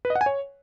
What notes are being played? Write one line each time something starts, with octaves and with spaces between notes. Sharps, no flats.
B4
D#5
F#5
G#5
C#5